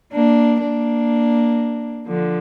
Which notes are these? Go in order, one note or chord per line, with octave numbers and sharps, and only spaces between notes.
A#3 D4
A#3 D4
D3 F3